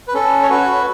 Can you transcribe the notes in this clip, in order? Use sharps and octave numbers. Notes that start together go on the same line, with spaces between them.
B4
C#4 A4
C#5
F#4 B4